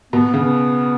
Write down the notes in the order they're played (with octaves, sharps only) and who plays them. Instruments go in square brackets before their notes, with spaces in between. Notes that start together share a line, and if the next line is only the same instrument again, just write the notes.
[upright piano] B2 [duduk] B3
[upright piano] C#3 [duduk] B3